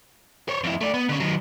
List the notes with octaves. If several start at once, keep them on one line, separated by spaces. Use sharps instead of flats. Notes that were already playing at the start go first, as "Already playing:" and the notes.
C5 C#5
F2 E4
A3 D5
B3
D3 C#4
D#3 F#3